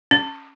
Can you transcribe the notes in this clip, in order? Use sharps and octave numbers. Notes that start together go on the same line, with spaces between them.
C#4